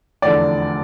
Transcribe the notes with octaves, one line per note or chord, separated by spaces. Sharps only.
F1 E2 D3 D5